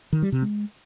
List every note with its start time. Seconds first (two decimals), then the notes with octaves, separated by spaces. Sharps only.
0.13 D#3
0.22 G3
0.32 C3
0.42 G#3